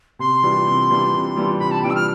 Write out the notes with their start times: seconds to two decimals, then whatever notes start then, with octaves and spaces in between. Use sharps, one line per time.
0.19 C3 C6
0.43 E3 G3 D4 F4
0.67 C3
0.90 E3 G3 D4 F4
1.13 C3
1.36 E3 G3 D4 F4
1.59 C3 B5
1.71 A5
1.83 E3 G3 D4 F4 G5
1.90 E6
1.95 F6